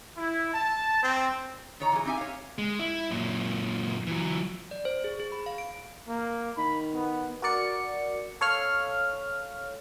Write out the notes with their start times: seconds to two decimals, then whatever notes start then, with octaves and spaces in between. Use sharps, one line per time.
0.17 E4
0.54 A5
1.03 C4
1.80 D#3 C#5 A#5
1.92 E3 F#3 G#4
2.05 C4 D#4 G4 E5 G#5
2.17 C#5 F5
2.58 G#3
2.79 E4
3.11 F#2 A#2
4.07 E3 F#3
4.71 D5
4.85 C5
5.04 G#4
5.20 G#4
5.32 B5
5.46 F5
5.58 D7
6.08 A#3
6.57 D#3 B5
6.94 B3
7.42 F#4 A#4 D5 C#7
8.41 A4 C#5 F5 F6